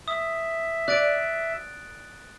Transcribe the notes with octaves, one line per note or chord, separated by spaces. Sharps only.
E5 D#6
D5 F#6 A6 D7